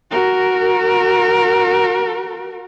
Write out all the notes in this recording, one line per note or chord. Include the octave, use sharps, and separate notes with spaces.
F#4 A#4